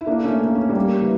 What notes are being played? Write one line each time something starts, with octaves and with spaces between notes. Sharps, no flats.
E4
A#3 D4
A3 C#4
A#3
C#4
G3 A#3
E3